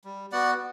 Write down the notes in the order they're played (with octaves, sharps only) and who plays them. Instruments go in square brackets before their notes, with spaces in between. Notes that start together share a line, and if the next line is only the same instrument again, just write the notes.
[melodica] G3
B3 F#4 D5 F#5